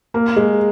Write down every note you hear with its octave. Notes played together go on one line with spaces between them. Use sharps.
A#3
G#3